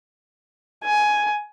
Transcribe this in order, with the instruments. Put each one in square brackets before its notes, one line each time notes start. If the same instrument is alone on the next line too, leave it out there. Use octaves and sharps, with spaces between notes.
[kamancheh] G#5